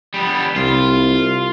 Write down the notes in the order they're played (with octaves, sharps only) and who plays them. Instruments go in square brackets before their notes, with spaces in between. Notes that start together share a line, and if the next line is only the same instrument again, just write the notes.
[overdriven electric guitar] G3 B3
[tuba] C2 [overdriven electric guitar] F4